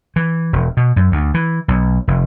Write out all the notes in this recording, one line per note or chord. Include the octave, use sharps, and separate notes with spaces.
E3
E1
B2
F#2
D2
E3
B1
F1